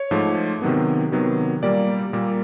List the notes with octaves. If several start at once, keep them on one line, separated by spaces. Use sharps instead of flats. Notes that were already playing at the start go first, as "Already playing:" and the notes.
Already playing: C#5
G#2 F3 A3
C3 D#3 F#3 B3
C3 D#3 F#3 B3
A#2 G3 A#3 D5
A#2 G3 A#3